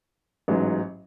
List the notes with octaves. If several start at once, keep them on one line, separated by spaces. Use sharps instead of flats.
A1 G#2 F#3